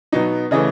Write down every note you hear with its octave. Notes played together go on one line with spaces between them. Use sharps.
B2 F#3 B3 D#4
C#3 E3 A3 D#5